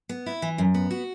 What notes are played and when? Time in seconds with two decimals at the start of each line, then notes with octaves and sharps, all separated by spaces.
0.09 B3
0.26 E4
0.42 E3
0.58 F#2
0.74 B3
0.91 F#4